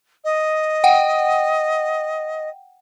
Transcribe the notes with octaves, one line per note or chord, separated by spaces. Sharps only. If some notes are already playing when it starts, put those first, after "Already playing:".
D#5
F#5 G5